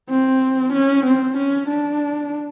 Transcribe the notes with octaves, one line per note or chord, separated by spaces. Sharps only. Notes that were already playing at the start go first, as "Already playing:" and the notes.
C4
C#4
C4
C#4
D4